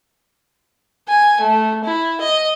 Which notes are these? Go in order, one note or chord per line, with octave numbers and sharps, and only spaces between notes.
G#5
A3
E4
D#5